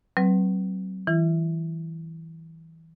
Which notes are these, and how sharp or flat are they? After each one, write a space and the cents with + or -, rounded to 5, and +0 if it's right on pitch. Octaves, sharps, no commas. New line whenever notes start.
F#3 +35 C4 +0 B4 +0
E3 -20 E4 +35